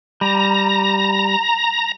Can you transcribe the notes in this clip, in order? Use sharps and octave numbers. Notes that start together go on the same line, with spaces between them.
G3 A#5